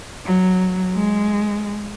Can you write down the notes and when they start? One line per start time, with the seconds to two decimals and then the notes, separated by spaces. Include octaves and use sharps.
0.25 F#3
0.95 G#3